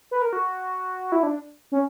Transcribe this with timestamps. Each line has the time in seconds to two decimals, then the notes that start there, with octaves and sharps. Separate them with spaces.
0.11 B4
0.22 A#4
0.33 F#4
1.12 E4
1.23 D4
1.72 C#4